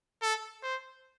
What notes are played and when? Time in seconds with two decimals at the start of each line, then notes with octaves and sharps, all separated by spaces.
0.22 A4
0.63 C5